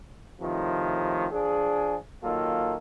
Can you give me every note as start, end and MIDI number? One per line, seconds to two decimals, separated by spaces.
0.41 1.26 45
0.41 1.26 48
0.41 1.26 51
0.41 1.26 53
1.32 1.94 53
1.32 1.94 62
1.32 1.94 68
2.24 2.74 51
2.24 2.74 54
2.24 2.74 58
2.24 2.74 65
2.24 2.74 69